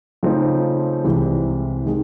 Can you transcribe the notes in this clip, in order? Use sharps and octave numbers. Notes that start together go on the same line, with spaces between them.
C#3 F3 A3 C4 D#4
C2 C3 E3 G#3
D#3 G#3